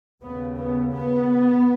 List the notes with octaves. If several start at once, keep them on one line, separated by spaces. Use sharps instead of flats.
D#2 C#3 B3
B3
B3